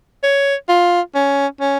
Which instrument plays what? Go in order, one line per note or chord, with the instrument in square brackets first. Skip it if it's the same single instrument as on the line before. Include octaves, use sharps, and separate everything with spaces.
[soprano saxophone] C#5
F4
C#4
C#4